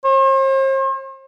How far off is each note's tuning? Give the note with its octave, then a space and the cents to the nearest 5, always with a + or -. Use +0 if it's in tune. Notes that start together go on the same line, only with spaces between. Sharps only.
C5 +45